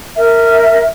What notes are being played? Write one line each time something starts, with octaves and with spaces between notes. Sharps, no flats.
A#4 E5